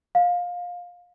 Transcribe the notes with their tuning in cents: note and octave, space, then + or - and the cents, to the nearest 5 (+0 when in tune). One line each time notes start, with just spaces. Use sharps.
F5 +20